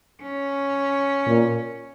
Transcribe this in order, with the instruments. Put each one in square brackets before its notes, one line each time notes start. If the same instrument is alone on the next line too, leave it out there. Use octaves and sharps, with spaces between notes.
[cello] C#4
[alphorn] A#2